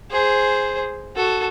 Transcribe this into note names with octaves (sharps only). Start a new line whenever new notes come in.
G#4 C5
F#4 A4